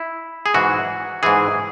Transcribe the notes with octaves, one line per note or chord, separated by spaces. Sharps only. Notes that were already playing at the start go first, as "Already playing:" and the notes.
Already playing: E4
G#4
G#2 E3 F#4
G#2 E3 G#4